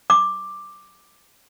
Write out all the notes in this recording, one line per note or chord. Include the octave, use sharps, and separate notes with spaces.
D6